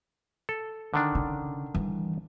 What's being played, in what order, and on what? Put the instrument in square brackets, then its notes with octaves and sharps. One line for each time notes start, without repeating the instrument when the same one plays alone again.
[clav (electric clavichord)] A4
D3 D#3 D4
[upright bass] C#3
E3 G3